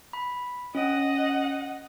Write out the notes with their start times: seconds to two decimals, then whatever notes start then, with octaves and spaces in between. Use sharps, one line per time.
0.13 B5
0.75 C#4 D#5 F#5